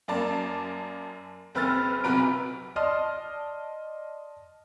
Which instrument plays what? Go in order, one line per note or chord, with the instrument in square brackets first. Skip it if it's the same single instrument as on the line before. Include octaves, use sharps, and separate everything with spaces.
[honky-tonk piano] F#2 A#3 D5 A5
F#1 C4 B4 E6 F6 A6
B1 C3 F#4 B4 A#5 D7
[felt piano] D5 D#5 A5 C6 D#6 F6